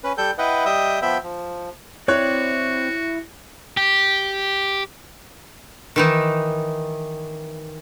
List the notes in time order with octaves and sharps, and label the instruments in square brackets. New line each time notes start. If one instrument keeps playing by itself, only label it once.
[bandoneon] C#4 B4
G3 A4 G5 G6
E4 B4 D#5 F#5 G5
G3 D#5 E5 G5 D#6
F3 B3 E5 G5 B5 E6
F3
[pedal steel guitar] C4 D5 F#6 [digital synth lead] E4 [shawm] F#4 [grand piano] C#5
[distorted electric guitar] G4
[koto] D#3 E3 D#4